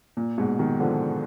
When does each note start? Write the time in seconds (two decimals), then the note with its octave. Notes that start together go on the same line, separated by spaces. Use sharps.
0.17 A#2
0.38 G#2 B2
0.59 B2 D#3
0.80 D3 F3